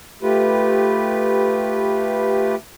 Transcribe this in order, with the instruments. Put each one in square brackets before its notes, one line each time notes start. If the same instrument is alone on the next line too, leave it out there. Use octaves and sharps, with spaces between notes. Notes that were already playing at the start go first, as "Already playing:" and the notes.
[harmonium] A3 F4 G4 B4